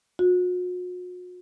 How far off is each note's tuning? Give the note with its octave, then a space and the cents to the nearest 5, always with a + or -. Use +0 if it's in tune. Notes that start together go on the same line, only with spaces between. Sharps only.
F#4 -45